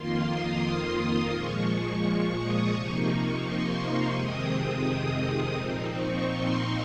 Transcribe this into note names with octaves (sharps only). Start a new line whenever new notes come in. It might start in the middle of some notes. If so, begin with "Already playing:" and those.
Already playing: F2 D#3 A#3 F4 C6
D#6
A#2 F3 G#3 C#6
D#6
C3 F3 A#3 D#4 C#6
C#6
C6
F2 C3 D#3 G#3 C4 D#6
D#6
D#6
A#2 F3 C4 D#4
C#6
C6